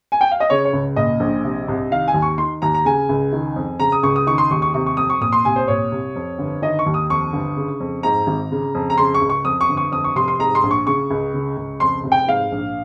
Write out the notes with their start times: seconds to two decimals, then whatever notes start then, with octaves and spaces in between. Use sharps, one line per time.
0.12 G#5
0.21 G5
0.31 F5
0.40 D#5
0.50 C#3 C#5
0.65 C#5
0.73 C#2
0.96 A#2 D#5
1.20 A#1
1.44 C3
1.68 C2
1.91 D#3 F5
2.08 G#5
2.14 D#2
2.22 C#6
2.38 D#3 C6
2.62 D#2 A#5
2.74 A#5
2.85 C#3 G#5
3.09 C#2
3.33 D#3
3.56 F2
3.80 C#3 A#5
3.92 D#6
4.03 C#2 C#6
4.16 D#6
4.27 D#3 C#6
4.38 C6
4.51 D#2 C#6
4.62 C#6
4.74 C3 C#6
4.86 C#6
4.97 F2 D#6
5.10 C#6
5.21 A#2 D#6
5.32 C6
5.45 C2 G#5
5.56 C5
5.68 A#2 C#5
5.92 C2
6.16 F2
6.39 G1
6.62 D#3 D#5
6.79 C#6
6.86 D#2
6.94 D#6
7.10 F2 C#6
7.33 G1
7.57 C#3
7.80 F2
8.03 G#2 A#5
8.27 G#1
8.52 C#3
8.75 F2
8.90 A#5
8.98 C#3 C6
9.14 C#6
9.22 C#2
9.29 C#6
9.45 F2 D#6
9.61 C#6
9.69 G1
9.77 C#6
9.92 F2 D#6
10.04 C#6
10.16 F1 C6
10.28 C6
10.39 G#2 A#5
10.55 C6
10.63 A#1
10.71 C#6
10.87 C#3 C#6
11.11 C#2
11.34 C#3
11.57 C#2
11.80 F2 C6
12.04 F1
12.12 G5
12.28 G#2 F5
12.52 A#1